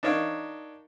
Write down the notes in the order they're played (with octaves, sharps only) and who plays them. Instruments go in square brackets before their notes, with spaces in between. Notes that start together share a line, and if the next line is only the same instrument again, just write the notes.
[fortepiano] D4 D#4 A#4 C#5 F5